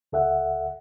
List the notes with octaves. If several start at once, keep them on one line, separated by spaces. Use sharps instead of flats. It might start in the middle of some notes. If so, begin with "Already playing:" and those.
C#2 A4 E5 F#5